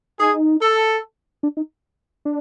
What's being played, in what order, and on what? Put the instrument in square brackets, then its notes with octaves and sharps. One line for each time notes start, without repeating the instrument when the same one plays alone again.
[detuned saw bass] D#4 [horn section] G#4
[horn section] A4
[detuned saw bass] D4
D#4
D4